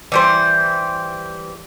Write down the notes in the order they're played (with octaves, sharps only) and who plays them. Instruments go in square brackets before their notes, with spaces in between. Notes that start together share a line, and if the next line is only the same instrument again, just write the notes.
[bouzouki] E3 G3 C5